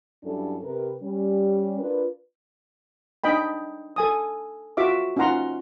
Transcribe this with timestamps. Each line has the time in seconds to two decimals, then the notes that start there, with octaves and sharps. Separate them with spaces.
0.23 G2 F#3 C#4 D4 E4 A4
0.63 C3 A#4 B4
1.02 G3 C#4
1.79 D4 F4 A#4 B4
3.24 D4 D#4 D#5 G5 B5
3.96 A4 G#5 D#6
4.77 F4 F#4 E5 D6
5.17 C#4 D#4 F4 F#5 A#5 C6